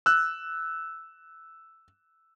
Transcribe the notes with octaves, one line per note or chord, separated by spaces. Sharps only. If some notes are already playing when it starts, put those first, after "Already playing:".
E6 F#6